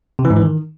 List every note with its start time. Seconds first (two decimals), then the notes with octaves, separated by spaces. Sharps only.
0.19 C3
0.25 E3
0.30 G#2
0.36 E3
0.42 D#3